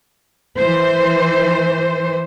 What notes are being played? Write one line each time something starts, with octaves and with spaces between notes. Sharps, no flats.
E3 C5